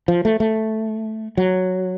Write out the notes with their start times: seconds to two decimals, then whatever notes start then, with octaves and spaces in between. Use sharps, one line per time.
0.08 F3
0.25 A3
0.40 A3
1.37 F#3